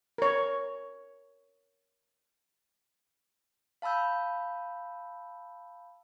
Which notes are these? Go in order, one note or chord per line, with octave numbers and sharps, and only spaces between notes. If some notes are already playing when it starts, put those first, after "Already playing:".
A#4 C#5
F5 A5 B5 E6 G6